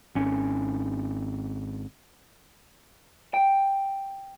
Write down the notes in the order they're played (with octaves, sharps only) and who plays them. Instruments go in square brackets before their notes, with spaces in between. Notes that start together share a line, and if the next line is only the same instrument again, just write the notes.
[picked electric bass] G#1 C#4
[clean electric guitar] G5